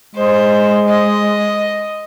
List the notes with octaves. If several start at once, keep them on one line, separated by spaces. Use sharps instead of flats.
G#3 C5
D#5